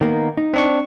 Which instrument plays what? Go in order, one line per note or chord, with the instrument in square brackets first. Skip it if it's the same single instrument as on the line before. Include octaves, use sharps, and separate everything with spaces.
[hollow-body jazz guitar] D#3 A#3 B3
D#4
[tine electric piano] C4 D4 C#6